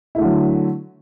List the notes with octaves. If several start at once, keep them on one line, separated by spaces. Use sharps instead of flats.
D3 F#3 A3 E4